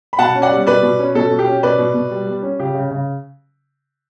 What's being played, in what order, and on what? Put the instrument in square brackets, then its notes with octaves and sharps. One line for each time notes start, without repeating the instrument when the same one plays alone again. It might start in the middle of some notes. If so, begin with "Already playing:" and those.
[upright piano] B5
B2 F#5 A5
C#4
D5 F#5
G3
B2 B4 D5
B2
C#4
B2 A4
B2
G4
C#4
B2 B4 D5
B2
B2
G3
G3
C#4
C#3 G4
C#3
C#3